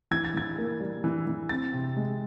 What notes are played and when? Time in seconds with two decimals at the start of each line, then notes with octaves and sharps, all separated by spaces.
0.11 E3 G#6
0.25 A6
0.34 E3 G#6
0.58 A#3
0.80 G3
1.04 E3
1.27 E3
1.49 C4 A6
1.73 C3
1.96 G#3